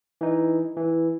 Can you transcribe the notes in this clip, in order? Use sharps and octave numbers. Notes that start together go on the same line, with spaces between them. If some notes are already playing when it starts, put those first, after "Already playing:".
E3 D#4
E3